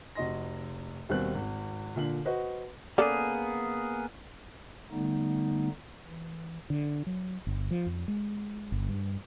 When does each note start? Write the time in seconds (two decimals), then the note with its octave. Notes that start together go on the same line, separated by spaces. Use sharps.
0.15 F1 F#4 D#5 C6 A#6
1.09 D#2 B2 G3 C4 A#4 F#6
1.34 G#1
1.96 A#2 D3 F#7
2.25 F#4 B4 C5 D#5
2.98 C#3 A#3 B3 G#4 A4 D5
4.91 D3 G3 A3 B3 D#4
6.04 E3
6.70 D3
7.07 F#3
7.47 G1
7.71 F3
7.86 F2
8.08 G#3
8.72 G1
8.89 G2